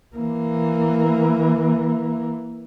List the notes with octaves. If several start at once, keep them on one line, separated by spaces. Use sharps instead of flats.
E3 A#3